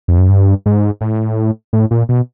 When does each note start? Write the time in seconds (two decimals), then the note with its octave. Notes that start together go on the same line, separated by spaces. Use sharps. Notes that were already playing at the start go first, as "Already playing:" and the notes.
0.08 F2
0.18 F#2
0.29 G2
0.66 G#2
1.01 A2
1.73 A2
1.91 A#2
2.09 B2